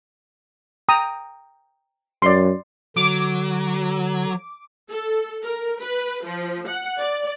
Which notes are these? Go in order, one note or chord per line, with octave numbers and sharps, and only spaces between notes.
G5 A#5 D#6
F#2 D5 C6
D3 F#3 D6 D7
A4
A#4
B4
F3
F#5
D5